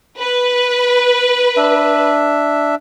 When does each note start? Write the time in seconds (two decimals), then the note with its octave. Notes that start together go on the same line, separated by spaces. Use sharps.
0.19 B4
1.57 D4 E5